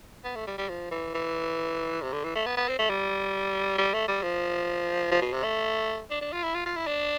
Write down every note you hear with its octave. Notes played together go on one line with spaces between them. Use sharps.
B3
A3
G3
G3
F3
E3
E3
C3
D3
E3
A3
B3
B3
C4
A3
G3
G3
A3
G3
F3
F3
B2
C3
A3
D4
D4
F4
E4
F4
F4
E4
D4